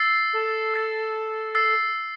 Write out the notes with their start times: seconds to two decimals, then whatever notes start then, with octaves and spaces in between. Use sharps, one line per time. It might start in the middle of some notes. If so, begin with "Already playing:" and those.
Already playing: E6 A6 C7
0.33 A4
0.74 E6 A6 C7
1.55 E6 A6 C7